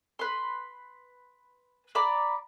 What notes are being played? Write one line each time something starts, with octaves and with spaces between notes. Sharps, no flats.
B4 C6
D5 A#5 B5 D6